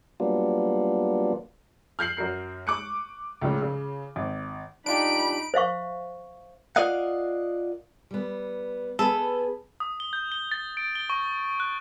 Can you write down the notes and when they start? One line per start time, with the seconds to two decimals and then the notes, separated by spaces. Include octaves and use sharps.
0.20 F#3 G3 A#3 B3 D4 F4
1.99 F6 G6 C7 F#7
2.17 F#2 F#4 A#4 C7
2.67 C#6 D6 F#6 C#7
3.42 C#2 A2 C#3
3.62 C#3
4.16 G#1
4.86 D4 D#4 F4 G4 B5 D7
5.54 C5 E5 F5 C#6
6.76 F4 A#4 D5 D#5 F5 F#5
8.11 G3 B3
8.99 B3 G#4 A4 B4
9.80 D#6
10.00 G7
10.13 G6
10.32 G7
10.52 A6
10.77 D7
10.95 G7
11.10 C#6
11.60 F#6